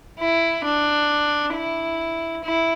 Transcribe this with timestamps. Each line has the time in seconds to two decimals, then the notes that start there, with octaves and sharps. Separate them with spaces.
0.19 E4
0.64 D4
1.54 E4
2.44 E4